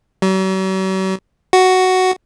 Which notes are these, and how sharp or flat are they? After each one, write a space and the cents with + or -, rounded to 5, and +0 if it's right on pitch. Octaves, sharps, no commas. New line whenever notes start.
F#3 +45
F#4 +5